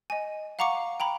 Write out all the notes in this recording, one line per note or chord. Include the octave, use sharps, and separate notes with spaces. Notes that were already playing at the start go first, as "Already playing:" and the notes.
D#5 G#5
F5 F#5 A#5 C#6 D6 C#7
G5 A#5 B5